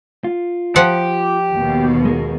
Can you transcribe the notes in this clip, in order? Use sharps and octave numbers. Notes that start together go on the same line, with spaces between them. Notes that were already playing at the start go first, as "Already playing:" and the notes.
F4
F3 G4 F#5
D#2 B2
G#3 G#4 A#4